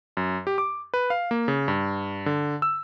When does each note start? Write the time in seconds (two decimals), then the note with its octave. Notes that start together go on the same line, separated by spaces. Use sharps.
0.17 F#2
0.47 G4
0.58 D6
0.94 B4
1.10 F5
1.31 A#3
1.48 C#3
1.68 G2
2.26 D3
2.62 E6